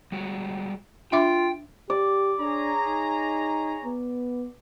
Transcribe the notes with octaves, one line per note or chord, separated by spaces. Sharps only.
G3 G#3 F#4
D4 F4 E5 G5 D6
G4 D5
D4 G#4 C#5 A#5
D#4
B3